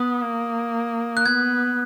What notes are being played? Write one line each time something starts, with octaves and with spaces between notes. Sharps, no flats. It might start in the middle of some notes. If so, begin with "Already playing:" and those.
Already playing: B3 D#6
A#3
F#6
B3 G#6